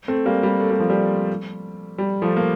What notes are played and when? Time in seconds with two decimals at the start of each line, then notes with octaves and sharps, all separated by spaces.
0.08 A3 C4
0.26 G3 A#3
0.43 G3
0.60 A3
0.70 G3
0.80 F3
0.90 G3
1.98 G3
2.22 F3 A3
2.36 A#3